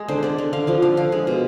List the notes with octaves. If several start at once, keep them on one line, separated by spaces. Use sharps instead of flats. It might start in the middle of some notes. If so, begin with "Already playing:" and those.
Already playing: G#3
D3 C5
D3 D5
D3
D3 F5
F3 F5
D3 F5
D3 F5
G#3
B2